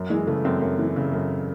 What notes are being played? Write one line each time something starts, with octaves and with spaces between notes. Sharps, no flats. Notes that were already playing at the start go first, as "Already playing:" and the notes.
Already playing: F#2
E3 G#3
C#3 A3
F#2 C4
F#2
E3
C#3
F#2